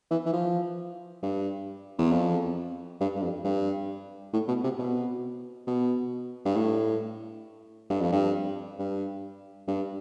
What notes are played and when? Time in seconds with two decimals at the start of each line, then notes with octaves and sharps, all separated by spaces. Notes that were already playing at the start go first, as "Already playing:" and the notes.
0.11 E3
0.26 E3
0.33 F3
1.22 G2
1.98 E2
2.11 F2
3.00 G2
3.16 G2
3.22 F2
3.44 G2
4.33 A2
4.48 B2
4.64 C3
4.79 B2
5.67 B2
6.46 G2
6.56 A2
7.90 G2
8.01 F2
8.12 G2
8.79 G2
9.68 G2